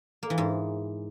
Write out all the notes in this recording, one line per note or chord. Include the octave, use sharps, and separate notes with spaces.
A#3
E3
G#2